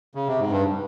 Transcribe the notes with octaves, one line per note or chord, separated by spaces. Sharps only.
C#3
C3
G#2
G2